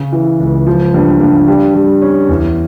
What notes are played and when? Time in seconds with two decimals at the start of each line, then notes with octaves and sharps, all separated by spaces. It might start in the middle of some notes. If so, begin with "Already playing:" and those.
Already playing: C#3
0.12 E3
0.40 C#2
0.67 F3
0.94 G2
1.21 G2
1.48 G3
1.75 G3
2.02 C#4
2.29 E2